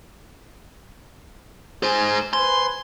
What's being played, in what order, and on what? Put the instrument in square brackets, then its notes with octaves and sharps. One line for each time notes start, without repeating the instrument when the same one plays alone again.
[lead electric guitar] G#2 C5 [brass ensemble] G#5
[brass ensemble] B4 C5 G#5 [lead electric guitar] C6